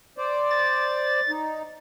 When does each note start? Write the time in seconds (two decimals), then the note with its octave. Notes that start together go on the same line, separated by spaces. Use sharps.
0.18 C5 D5
0.50 A6
1.29 D#4